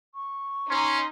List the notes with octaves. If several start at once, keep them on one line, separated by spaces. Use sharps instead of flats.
C#6
C#4 D#4 C6